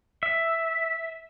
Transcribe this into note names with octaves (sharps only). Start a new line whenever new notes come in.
E5